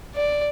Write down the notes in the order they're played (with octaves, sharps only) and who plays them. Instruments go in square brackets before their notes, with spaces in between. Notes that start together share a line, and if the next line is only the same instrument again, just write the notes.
[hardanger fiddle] D5